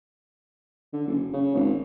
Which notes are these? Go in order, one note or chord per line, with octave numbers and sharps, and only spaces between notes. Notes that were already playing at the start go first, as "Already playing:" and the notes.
D3
F#1
C#3
G#1